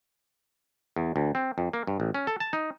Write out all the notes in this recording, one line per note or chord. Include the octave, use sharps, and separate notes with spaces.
E2
D2
C4
F2
A#3
G2
A1
C#4
A4
A5
D#4